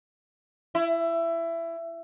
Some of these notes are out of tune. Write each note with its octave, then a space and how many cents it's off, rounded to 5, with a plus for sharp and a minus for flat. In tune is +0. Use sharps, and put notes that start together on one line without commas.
E4 +20